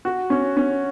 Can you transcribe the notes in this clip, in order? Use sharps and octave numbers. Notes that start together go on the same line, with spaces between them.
F#4
C#4
C#4